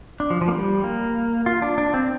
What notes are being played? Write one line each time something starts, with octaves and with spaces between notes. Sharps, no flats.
D4
F3
F3
A#3
G3
A#3
F4
D4
D4
C4